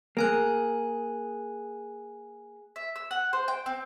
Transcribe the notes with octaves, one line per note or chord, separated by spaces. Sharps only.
A#3 G#4 G#5 F#6
E5
E6
F#5
C5
G5
C4